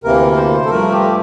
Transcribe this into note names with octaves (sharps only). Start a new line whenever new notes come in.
D2 C3 E3 A#3 A#4
C5
A4
G2 F3 A3 A#4
G4